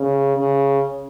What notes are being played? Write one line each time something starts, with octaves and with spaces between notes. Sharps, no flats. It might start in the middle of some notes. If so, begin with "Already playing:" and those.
Already playing: C#3
C#3